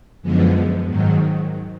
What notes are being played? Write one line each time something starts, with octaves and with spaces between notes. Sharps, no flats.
F#2 D3 F3 G#3 B3
G#2 D#3 F#3